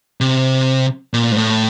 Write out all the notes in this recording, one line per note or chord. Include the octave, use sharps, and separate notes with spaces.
C3
A#2
G#2
A2